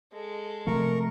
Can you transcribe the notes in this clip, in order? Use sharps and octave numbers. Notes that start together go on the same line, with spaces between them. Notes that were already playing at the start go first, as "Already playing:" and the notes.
G#3 A4
C3 F3 A3 A#4 C#6